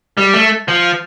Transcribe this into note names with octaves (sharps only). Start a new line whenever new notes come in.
G3
A3
F3